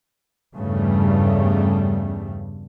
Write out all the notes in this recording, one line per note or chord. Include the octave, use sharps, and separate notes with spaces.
E2 G2 C#3 G3 A3